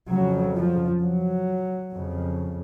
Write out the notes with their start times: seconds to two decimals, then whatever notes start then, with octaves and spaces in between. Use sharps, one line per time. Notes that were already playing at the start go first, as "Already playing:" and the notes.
0.11 F2 C#3 F#3
0.56 F3
1.03 F#3
1.93 F2 C#3